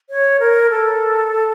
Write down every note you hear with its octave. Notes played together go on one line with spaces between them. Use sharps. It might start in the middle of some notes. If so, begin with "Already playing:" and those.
C#5
A#4
A4